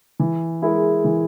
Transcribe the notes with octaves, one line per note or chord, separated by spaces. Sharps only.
E3
G#3 E4 A#4
E3